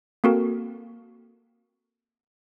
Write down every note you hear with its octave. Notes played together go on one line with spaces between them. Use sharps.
A#3 C4 F#4 A4 A#4